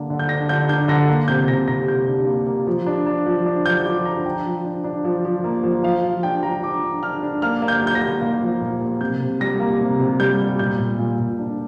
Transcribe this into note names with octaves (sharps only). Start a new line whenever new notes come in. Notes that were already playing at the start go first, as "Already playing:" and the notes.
Already playing: D3 A#3 D4
D3
G6
D4 A#6
D3 G6
D4 G6
D3 A#6
A#3
C3 G6
C3 A#6
C3 A#6
C3 G6
D4
A#3
A#3
F3
D4
D4
F3
D4
F3 G6
F3 D6
D4 A#5
D4 G5
F3
D4
D4
F3
F3
A#3
F3
F3 F5
F3
D4 G5
F3 A#5
D4 D6
D4
D4 F6
D4
A#3 F6
A#3
G6
A#3
G6
A#6
A#3
A#3
F3
A#2
A#3
C3 G6
C3
G3 A#6
A#3
C3
C3
G3 G6
G3
A#2 G6
A#2
A#2
A#2
D4